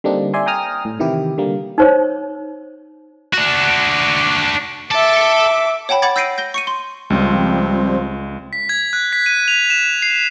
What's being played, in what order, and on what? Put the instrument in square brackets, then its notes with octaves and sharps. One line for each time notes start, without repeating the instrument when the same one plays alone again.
[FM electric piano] D3 G3 A#3 C4 D4 D#4
D5 E5 G#5 C6
G5 G#5 A#5 D#6 F6
A2
C3 D#3 E3 E4 G4
D3 G3 A#3
[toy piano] D#4 C5 C#5
[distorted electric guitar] D4 F#4
[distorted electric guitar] A4 A5 [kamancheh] E5 D6
[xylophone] C#5 F#5 G5 A5 B5
F#5 B5 D6 G#6 A6
E6 G6 A#6 C7 D7 D#7
G6 A#6 G7
C#6 C#7 D#7
C6
[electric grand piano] C#2 [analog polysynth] F3 G3 C4
[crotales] B6
G#6
F#6
B6
D#7
F7
E7
C7